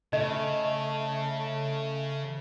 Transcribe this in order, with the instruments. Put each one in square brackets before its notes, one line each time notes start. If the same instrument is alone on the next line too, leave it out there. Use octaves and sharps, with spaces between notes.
[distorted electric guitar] C#3 [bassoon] A3 [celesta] D#5